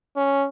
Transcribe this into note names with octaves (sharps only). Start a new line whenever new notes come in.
C#4